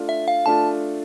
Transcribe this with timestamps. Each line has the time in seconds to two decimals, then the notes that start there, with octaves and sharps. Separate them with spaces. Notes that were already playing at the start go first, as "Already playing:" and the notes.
Already playing: A3 D4 F4
0.09 E5
0.28 F5
0.46 A3 D4 F4 A5